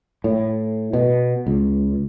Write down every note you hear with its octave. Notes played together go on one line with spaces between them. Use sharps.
A2
B2
C#2